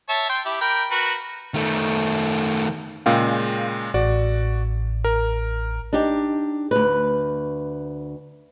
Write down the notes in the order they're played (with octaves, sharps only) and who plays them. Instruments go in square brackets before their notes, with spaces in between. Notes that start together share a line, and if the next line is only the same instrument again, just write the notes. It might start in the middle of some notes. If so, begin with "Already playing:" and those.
[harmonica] C#5 E5 A5
G5 C6
E4 G4
A#4 G5 B5
F#4 A#4 B4
[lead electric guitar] D#3 A3
[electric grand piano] A#2 C#3 G#3 [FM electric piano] F5 G5
[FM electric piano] A1 [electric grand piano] F#4 D5
[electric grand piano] A#4
[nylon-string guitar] D4 D#4 G4
D2 B4